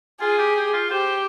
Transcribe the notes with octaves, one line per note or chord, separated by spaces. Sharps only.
F4 G#4
G4
G4
F4
G4 C5